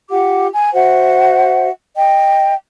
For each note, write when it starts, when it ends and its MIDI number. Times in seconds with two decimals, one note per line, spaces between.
0.10 0.47 65
0.10 0.47 67
0.10 0.47 78
0.10 0.47 86
0.52 0.73 80
0.74 1.69 66
0.74 1.69 72
0.74 1.69 76
0.74 1.69 78
1.95 2.53 75
1.95 2.53 79